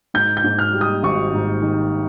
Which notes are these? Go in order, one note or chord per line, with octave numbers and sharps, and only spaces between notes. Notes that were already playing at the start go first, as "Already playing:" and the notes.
G#2 G6
G6
G#2
F6
G3
D#6
G#1 C#6
G#2
D#3